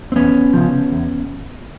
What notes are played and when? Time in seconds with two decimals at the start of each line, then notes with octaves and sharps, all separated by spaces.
0.12 C4
0.16 E2 B3 C#4
0.53 C#3 F3
0.92 E2